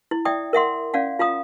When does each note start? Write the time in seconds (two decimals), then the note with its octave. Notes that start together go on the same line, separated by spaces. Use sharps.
0.11 E4
0.25 D5 E5 G5 D#6
0.53 A#4 E5 F#5 C6
0.94 C#4 D5 F5 F#5
1.19 F4 F5 A#5 D#6